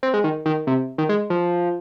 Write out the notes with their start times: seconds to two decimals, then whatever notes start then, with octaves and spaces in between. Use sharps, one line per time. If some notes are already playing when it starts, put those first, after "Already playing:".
0.03 C4
0.14 G#3
0.24 D#3
0.46 D#3
0.67 C3
0.98 D#3
1.09 G#3
1.30 F3